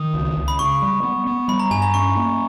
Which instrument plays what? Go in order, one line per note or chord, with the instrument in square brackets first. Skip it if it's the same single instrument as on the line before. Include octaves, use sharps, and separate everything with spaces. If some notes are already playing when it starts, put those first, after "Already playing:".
Already playing: [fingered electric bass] D#3 [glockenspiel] D#6
[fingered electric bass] C#2
C#2
[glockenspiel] B5
[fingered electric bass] C#3 [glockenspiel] C#6
[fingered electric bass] G3
B3
B3
[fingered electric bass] G3 [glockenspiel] B5
[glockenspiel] A#5
[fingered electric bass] G2 [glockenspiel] G#5
[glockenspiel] A#5
[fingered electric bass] C#4 [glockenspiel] C#6
[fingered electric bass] A#3